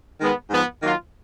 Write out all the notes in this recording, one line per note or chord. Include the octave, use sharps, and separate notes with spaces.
D#3 G#3 B3
G#2 F3 B3
D#3 F#3 A#3 F4